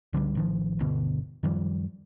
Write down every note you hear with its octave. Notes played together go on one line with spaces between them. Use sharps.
C#2 D3 F3 G3
A1 D#3 F3
G1 D2 B2 D3
F#2 D#3 F3 G3